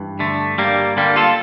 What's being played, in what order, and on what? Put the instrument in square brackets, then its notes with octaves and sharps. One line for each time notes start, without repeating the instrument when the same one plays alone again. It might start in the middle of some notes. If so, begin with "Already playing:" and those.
Already playing: [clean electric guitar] G2 E3
D3 A3
G2 G3 A#3
D3 G3 A#3
F4 A4